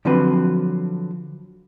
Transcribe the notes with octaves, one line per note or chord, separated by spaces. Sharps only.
D3 F3 F#3 C4 B4